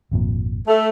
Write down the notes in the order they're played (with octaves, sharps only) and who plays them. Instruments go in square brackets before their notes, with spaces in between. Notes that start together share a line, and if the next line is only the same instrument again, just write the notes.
[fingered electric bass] G#1 F2 A#2
[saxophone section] A3